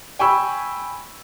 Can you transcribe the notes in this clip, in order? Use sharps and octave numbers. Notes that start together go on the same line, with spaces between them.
G5 G#5 B5 C#6 E6